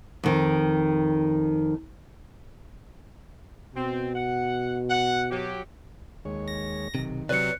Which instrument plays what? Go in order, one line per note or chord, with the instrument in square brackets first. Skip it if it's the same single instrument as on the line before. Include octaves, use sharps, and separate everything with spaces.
[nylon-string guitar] F2 D#3
[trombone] B2 [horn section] C4
[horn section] F#5
F#5
F#3 G4
[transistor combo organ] D#2 G#3 C#5
[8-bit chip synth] A#6
[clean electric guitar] B1 C3 [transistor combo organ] D#3
[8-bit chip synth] C3 F#3 [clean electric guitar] B4 C#5 D5 [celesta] F#6 C#7